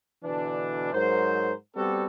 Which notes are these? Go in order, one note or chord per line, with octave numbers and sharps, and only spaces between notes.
B2 D3 E3 D4
G#2 F#3 A#4 C5
G3 B3 C4 F#4 A4